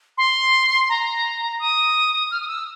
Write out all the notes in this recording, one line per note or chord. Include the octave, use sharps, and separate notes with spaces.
C6
A#5
D#6
F6
D#6
E6